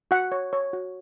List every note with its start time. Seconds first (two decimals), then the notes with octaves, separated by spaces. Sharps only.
0.11 F#4 F#5
0.32 C#5
0.53 C#5
0.73 F#4